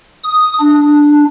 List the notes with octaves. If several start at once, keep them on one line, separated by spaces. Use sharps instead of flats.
D#6
D4